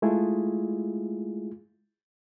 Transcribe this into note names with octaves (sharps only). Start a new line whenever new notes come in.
G#3 A3 E4 F4 G#4